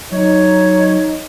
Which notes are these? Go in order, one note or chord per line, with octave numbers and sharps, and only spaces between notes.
F#3 D#4 C#5